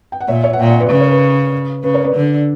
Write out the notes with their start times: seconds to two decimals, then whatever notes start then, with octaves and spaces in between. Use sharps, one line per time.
0.12 G5
0.21 F#5
0.28 A#2 C#5 E5
0.43 C#5 E5
0.53 F#5
0.59 A#2 E5 G5
0.69 D5 F#5
0.80 B4 D5
0.90 C#3 B4 D5
1.00 A#4 C#5
1.11 B4
1.83 C#3 B4
1.94 A#4 C#5
2.04 B4 D5
2.15 D3